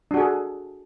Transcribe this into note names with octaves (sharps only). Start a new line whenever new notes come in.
D4 F#4 G#4 A4